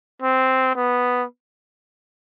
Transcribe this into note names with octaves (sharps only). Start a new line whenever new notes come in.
C4
B3